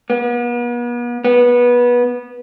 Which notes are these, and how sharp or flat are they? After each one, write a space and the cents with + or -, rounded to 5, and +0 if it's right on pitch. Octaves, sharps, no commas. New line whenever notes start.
B3 -40
B3 -20